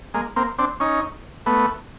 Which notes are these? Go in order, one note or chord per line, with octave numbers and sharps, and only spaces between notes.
G#3 A#3
A#3 C4
C4 D4
C#4 D#4
A3 B3